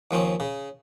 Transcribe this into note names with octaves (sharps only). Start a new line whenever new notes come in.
D#2 F3 C4 C#4
C#3